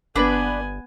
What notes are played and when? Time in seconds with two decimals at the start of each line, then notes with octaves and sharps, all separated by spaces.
0.16 G1 B3 D4 B4 D5 G#5